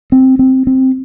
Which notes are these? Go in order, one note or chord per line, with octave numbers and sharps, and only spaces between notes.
C4
C4
C4